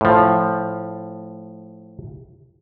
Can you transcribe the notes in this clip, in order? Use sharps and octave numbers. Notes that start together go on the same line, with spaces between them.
A2 F3